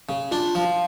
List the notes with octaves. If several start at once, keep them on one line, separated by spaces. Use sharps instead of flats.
C#3
D4 F4
F3